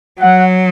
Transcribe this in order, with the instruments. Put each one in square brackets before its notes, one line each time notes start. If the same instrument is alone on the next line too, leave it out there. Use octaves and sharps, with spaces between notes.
[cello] F#3 [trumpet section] F#5